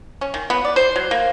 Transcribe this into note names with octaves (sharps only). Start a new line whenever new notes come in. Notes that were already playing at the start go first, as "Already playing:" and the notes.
C#4
D#3
B3
D5
C5
F#3
A#3